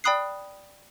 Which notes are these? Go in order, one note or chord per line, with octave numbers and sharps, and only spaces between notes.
D5 G5 B5 D#6 F#6 C7